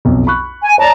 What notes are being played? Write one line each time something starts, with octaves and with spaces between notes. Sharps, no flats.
B1 F2
B5 C#6 F#6
G#5
C#5 D5 A5 A#5